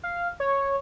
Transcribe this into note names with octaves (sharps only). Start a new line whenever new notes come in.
F5
C#5